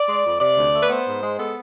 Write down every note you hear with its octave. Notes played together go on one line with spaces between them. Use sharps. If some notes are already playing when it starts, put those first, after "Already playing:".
Already playing: D5
G#3
F2
C3 D5
D2
A3
B4
B3 C5
G#2
G#3
B3 A4